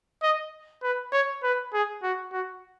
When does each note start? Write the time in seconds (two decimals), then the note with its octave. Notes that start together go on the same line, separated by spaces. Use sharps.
0.23 D#5
0.83 B4
1.13 C#5
1.43 B4
1.73 G#4
2.03 F#4
2.33 F#4